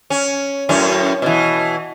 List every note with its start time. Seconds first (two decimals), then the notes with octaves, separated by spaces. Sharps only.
0.10 C#4
0.69 F#2 A2 C#4
1.22 B2 E3